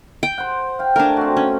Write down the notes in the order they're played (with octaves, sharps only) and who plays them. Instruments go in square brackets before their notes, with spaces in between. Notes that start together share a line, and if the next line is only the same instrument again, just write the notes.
[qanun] G5
[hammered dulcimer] C5 F#5
F5 G5
[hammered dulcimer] A3 G#5 [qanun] D4 A#4
[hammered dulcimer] C4 F#4
[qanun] C#4